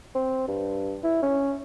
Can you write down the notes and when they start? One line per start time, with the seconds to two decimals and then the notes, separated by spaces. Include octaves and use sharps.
0.15 C4
0.48 G2
1.04 E4
1.23 C#4